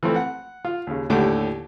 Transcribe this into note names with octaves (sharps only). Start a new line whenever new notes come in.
E3 F3 A3 C4
F#5
F4
D#2 C#3
D#2 A2 D3 G4 D6